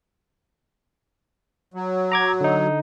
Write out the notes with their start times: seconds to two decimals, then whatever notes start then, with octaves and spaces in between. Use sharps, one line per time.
1.74 F#3
2.12 A#5 D6 G#6
2.41 D3 D#4